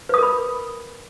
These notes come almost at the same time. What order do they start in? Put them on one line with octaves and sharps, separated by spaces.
B4 D#6 A#4 B5